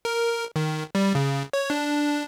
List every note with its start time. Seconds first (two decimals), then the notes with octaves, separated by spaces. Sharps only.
0.05 A#4
0.56 D#3
0.95 G3
1.15 C#3
1.53 C#5
1.70 D4